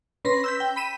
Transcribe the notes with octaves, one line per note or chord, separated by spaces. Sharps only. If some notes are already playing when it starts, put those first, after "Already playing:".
C#4 B4 C6 A#6 B6
E6 G6 B6
G5
B5 B6 D#7 E7